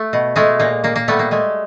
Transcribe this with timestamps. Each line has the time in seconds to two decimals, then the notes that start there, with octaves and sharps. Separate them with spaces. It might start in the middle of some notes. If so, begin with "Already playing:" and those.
Already playing: A3
0.13 B2
0.36 G#3 A3
0.59 A#2 A#3
0.84 A#2 A#3
0.96 A#3
1.08 G3 A3 B3
1.19 A#3
1.31 G#3 A3